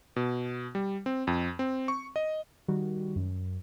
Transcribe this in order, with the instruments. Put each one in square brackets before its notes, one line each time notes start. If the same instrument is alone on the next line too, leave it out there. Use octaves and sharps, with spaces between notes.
[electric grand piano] B2
G3
C4
F2
C4
C#6
D#5
[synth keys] D#3 G3 F#4
F#2